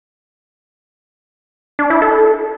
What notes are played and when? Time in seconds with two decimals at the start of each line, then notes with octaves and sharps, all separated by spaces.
1.79 D4
1.90 E4
2.02 A4